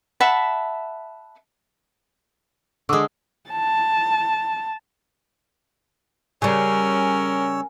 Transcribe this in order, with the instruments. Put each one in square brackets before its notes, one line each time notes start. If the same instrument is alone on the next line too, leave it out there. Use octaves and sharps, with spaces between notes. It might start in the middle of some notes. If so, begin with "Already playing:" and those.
[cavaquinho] E5 F#5 A5 B5
[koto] D3 G#3 [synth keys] C#6 D6 E6
[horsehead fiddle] A5
[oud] C#3 G3 [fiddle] C#4 A#4 [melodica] C#5 E6 [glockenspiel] G#5